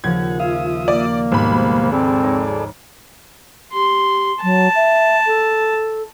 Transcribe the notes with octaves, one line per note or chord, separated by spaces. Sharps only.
D#2 C#3 F3 F#5 G#6
F4 E5 F5 D#6
A#3 D5
G#1 G#2 B2 G3 C5 B5
C4 G#4 A4 D5
D#4 C#5
G4 C6
F#3 A5
E5
A4